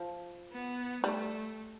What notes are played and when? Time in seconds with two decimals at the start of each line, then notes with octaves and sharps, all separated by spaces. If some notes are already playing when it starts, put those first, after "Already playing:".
Already playing: F3
0.51 B3
1.03 G3 A3